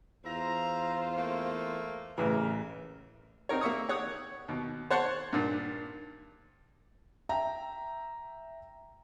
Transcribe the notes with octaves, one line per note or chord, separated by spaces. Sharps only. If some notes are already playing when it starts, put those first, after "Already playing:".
E2 F4 C5 E5 A#5
A3 A#3
A1 C#3 E3 A#4
C4 D#4 A#4 C#5
A#3 E5 C#6 D#6
G4 C#5 F#5 D#6
D#2 B2
C5 C#5 F#5 A5 C6 C#6
G2 A#2 D#3
E5 G5 A#5